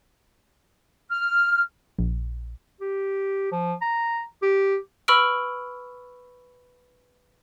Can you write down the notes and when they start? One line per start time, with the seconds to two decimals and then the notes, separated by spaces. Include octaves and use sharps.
1.10 F6
1.99 A#1
2.81 G4
3.52 F3
3.82 A#5
4.42 G4
5.08 B4 B5 C#6 E6 F6 D7